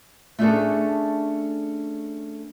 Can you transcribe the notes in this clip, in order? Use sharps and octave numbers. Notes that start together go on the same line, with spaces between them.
A3 C#4 D4 F#4 G#4 A4